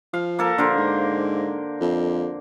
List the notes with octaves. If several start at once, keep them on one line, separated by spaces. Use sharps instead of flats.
F3 F5
A#3 A4 A#4
A#1 D3 A#4 C5
G#2
F2